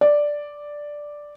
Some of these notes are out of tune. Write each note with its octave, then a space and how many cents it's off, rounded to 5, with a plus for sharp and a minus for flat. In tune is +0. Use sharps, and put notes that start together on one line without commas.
D5 +0